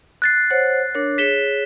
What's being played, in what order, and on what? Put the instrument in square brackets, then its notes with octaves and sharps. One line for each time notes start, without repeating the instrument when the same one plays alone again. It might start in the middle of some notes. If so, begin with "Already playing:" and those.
[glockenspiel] F#6 A6 C7
[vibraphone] C5 C#5 F#5
D4 A#4 C#5
[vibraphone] G#4 C#5 [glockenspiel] B6 E7 G7